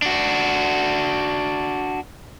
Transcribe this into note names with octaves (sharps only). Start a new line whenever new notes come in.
D4 F#4